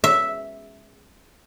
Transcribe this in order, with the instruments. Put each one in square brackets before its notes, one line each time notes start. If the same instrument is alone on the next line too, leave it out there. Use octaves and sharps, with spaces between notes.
[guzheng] E5